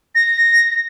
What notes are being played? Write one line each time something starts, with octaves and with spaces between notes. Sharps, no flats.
A#6